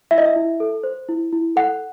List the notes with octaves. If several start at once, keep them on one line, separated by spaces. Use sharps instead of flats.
E4 E5
D#5
E5
E4
A4
C5
E4
E4
A4 F#5